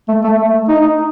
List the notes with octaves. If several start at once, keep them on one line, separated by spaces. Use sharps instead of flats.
A3
A3
D#4